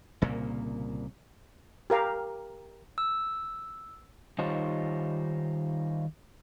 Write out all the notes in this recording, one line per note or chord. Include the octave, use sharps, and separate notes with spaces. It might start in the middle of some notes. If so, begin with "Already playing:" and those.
C2 A#2 C#3 A#3
G4 A#4 F5
E6
D#3 G3 D#4 F4 C5 C#5